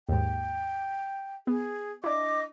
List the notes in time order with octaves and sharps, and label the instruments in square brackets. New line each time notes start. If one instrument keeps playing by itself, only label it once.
[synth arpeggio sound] D#2 G#2 [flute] G5
[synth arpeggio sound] B3 [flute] G#4
[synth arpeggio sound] D4 E4 [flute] D#5 [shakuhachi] D6